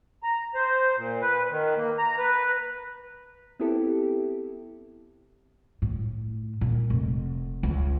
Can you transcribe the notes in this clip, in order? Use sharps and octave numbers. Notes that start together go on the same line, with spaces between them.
A#5
C5
A#2
B4
D#3
A#3
A#5
B4
B3 C4 E4 G4 A4
A2
A#2
F1
C#2